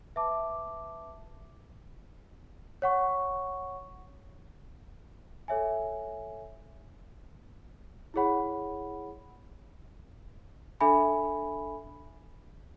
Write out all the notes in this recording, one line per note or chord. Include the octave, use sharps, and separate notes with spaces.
B4 E5 A5 D6
C#5 F#5 C#6
A4 C#5 E5 G#5
E4 G#4 C#5 F#5 B5
D4 A4 E5 G#5 B5